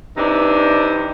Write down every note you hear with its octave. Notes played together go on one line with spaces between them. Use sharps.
C3 E3 D4 D#4